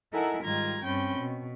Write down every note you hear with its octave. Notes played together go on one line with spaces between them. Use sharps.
D#4 E4 A4 A#4 F#5 G#5
G#2 D#3 G3 F4 A#5 G#6
G2 C4 C#4 G5 B5 G6
B2